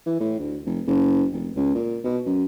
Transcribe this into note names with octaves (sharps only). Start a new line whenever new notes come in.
E3
A2
D2
F1
F#1
F1
C#2
A#2
B2
F#2